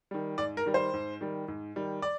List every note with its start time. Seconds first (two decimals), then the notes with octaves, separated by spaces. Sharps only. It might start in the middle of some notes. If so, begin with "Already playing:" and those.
0.11 D#3 G3
0.38 G#2 D5
0.57 A#4
0.66 D#3 G3
0.74 C5
0.93 G#2
1.21 D#3 G3
1.48 G#2
1.76 D#3 G3
2.02 D5